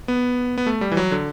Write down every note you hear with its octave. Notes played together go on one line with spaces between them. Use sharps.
B3
B3
A3
G3
E3
F#3
D3